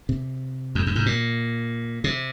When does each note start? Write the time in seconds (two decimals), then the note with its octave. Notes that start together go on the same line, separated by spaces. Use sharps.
0.09 C3
0.75 F2
0.87 F#2
0.96 G#2
1.06 A#2
2.04 C3